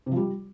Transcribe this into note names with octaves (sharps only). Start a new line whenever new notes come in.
C3
F3
G3